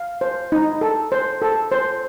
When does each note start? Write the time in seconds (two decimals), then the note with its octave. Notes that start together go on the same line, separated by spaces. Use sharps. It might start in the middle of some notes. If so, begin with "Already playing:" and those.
Already playing: F5
0.21 C5
0.52 D#4
0.81 A4
1.12 C5
1.42 A4
1.72 C5